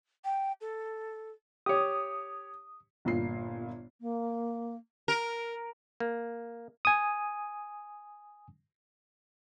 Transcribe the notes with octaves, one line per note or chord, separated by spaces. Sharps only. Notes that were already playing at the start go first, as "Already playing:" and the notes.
G5
A4
G4 C#5 D#6
G1 A#2 C7
A#3
A#4
A#3
G#5 D#6